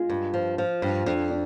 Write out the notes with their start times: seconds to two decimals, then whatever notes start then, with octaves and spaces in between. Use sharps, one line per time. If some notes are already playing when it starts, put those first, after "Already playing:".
Already playing: G#3 F4
0.10 G2
0.34 F3
0.58 F3
0.82 G2
1.06 F2 D4
1.30 D4